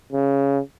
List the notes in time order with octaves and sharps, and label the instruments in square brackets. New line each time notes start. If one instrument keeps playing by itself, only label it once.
[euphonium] C#3